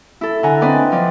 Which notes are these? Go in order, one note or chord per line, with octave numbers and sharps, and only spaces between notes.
E4 A4
D3 F#5 G#5 A#5
C4 D4 B4 D5 D#5 G5
F3 D5